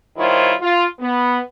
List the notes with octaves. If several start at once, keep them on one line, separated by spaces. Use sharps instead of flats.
D#3 G3 E4 F4 C5 C#5
F4
B3